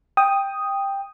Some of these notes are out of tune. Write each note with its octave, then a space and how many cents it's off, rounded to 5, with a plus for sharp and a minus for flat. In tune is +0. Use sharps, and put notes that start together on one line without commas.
G5 +10 D#6 +0